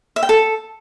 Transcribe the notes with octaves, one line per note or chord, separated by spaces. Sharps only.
E5
G5
A4